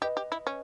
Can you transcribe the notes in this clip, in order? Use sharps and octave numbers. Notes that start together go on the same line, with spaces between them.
G4 B4 D#5
G4
E4
C#4